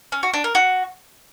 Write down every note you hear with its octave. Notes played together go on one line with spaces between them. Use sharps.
C#4
F#4
D4
A#4
F#4